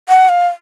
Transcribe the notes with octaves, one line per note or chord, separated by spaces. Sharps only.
F#5
F5